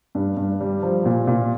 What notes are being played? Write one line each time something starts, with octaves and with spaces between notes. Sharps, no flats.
G2
G2
G3
F3
A#2
A#2